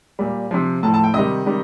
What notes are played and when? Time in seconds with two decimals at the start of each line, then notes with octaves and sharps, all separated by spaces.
0.19 A#2 G3
0.51 C3 F3
0.83 A2 A5
0.86 F3
0.94 A5
1.04 G5
1.14 C3 D#3 G3 D#5
1.46 C3 D#3 G3